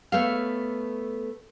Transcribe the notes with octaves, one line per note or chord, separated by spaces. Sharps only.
A3 B3 A4 C#5 F5